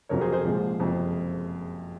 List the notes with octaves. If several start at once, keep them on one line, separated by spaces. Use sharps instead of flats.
F1 F2 C#3 F#3 A#4 C#5
G#4 C5
G#4 C5
C2 A#2 F3 G#3
F#1 F2 C3 F3